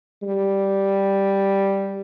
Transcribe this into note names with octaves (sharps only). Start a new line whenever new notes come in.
G3